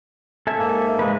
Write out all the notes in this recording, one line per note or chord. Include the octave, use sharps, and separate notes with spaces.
A4 E5 G#5
G#2 A#3
G#3 B4